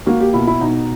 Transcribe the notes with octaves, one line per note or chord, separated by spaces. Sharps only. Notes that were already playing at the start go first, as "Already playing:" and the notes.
A#3 F#4
G4
B2 E4
E4
B2 D#4